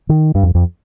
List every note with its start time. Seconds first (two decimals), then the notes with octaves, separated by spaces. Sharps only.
0.09 D#3
0.35 G2
0.43 F2
0.55 F2